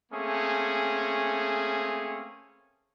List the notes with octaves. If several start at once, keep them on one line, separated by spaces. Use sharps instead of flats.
A3 A#3 C4 C#4 G#4